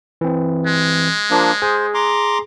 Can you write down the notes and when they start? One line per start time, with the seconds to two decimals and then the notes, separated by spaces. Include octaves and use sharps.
0.21 E3 C4
0.66 G#3
1.30 F3 A#3 D4
1.62 G#4 C5
1.94 A#5 C6 D6